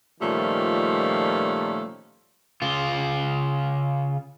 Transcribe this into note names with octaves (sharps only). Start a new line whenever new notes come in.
A#2 D#3 F3 G3 A3 C#4
C#3 F4